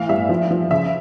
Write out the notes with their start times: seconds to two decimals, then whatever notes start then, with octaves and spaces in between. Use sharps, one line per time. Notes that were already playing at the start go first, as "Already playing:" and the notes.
Already playing: A2 E3 F5
0.09 G2 E5
0.29 F3
0.51 F3
0.71 C#3 E5